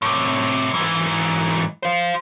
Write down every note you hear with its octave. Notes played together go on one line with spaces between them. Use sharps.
A2 C3
G#2 E3
C5 F5